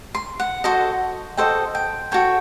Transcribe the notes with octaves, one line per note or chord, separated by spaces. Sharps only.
C6
F#5
F#4 A4 C5 D#5
F#4 A4 C5 D#5 G5
G5
F#4 A4 C#5 G5